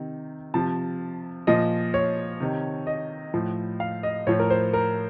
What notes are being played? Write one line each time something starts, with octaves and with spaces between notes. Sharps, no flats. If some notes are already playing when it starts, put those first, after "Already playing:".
Already playing: C3 D#3
C3 F3 A5
A#2 F3 D#5
C#5
C3 D#3
D#5
A2 F3
F5
D#5
A2 F3 C#5
A#4
C5
A#4